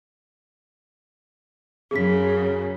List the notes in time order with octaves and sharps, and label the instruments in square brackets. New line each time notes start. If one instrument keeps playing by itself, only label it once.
[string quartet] F#2 C#3 [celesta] G#4 B6